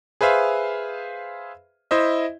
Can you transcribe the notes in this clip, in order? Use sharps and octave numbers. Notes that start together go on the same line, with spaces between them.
G#4 B4 C5 E5 F5
E4 C5 D#5 E5